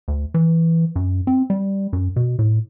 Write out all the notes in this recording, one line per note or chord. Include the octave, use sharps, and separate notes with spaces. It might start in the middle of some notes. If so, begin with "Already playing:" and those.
D2
E3
F#2
C4
G3
F#2
B2
A2